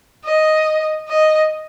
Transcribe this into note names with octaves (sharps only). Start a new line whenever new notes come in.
D#5
D#5